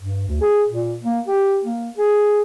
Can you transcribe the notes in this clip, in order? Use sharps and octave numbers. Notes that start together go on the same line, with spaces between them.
G2
D2
G#4
A#2
A#3
G4
A#3
G#4